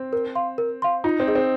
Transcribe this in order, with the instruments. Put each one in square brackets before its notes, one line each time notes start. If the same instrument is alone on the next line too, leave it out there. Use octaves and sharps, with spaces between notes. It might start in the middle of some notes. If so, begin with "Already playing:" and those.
Already playing: [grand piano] C4
[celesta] A#4
F5 C6
A#4
F5 C6
[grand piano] D#4 [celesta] F4
[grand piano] C4
[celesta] G#4 D#5
[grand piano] C4